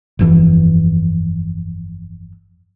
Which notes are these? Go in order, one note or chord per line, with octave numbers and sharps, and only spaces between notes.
G1 F2 E3